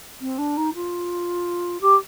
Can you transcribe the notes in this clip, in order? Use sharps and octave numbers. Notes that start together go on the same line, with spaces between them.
C4
D4
D#4
F4
G4